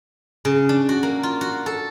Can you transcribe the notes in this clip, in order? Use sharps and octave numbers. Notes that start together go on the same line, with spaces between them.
C#3
D4
F#4
A#3
F4
F#4
A4